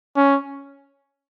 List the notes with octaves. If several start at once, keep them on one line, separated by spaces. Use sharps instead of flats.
C#4